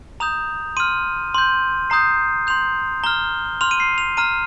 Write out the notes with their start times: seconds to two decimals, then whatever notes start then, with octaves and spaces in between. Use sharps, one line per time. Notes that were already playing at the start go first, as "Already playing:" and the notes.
0.20 A#5 D#6 G6 F7
0.77 C6 F6 D#7
1.35 C6 G6
1.90 A#5 D#6 G6 C7
2.47 C6 G6 F7
3.04 A#5 F6 G7
3.61 C6 F6 F7
3.71 D#7
3.80 C7
3.98 F7
4.17 A#5 F6 D#7